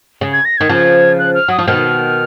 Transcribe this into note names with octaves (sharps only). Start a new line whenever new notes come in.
C#3
G#6
A#6
D#3 G#6
C#3 F3
F#6
F6
F#3 D#6
F3
B2 D#3 F6